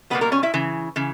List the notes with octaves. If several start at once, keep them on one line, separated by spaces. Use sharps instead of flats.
B2 G3 A#3 B3 B4
A#3 A#4
C#4 C#5
E4 E5
C#3 E3
C#3 E3